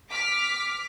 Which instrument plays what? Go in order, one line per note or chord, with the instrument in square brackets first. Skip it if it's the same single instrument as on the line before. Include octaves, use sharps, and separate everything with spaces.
[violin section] D6 F6 B6